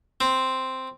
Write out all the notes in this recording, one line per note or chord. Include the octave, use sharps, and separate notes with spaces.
C4